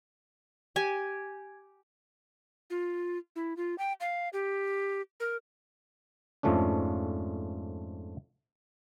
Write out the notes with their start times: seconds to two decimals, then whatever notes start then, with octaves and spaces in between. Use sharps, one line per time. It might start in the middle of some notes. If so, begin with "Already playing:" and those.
0.76 G4 G#5
2.70 F4
3.36 E4
3.57 F4
3.78 G5
4.00 F5
4.33 G4
5.20 A#4
6.43 F2 G#2 F3 A3 C#4 D4